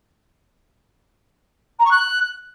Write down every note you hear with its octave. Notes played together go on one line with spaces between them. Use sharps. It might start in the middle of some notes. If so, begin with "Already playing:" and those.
A#5
C#6
F#6